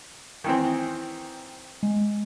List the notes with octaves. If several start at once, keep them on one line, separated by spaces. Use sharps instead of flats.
D#3 E3 C4
G#3